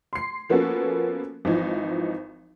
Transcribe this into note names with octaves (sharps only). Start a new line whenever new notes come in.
C6 C7
F3 A#3 B3 C#4 F#4 A4
G#1 E3 F3 D#4